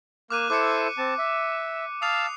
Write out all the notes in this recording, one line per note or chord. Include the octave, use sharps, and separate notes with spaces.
A#3 D6 F6 F#6 D#7
E4 A4 C5 D6 C#7
C4 A5
E5
F5 A5 D#6 E6 C7 F7